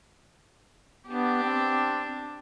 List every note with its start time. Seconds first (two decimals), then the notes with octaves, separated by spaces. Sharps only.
1.07 B3 D4 G4
1.43 C4